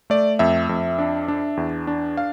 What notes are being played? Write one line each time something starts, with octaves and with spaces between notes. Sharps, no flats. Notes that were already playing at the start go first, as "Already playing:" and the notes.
A3 D5
F2 E5
F2
D4
D4
E2
D4
F5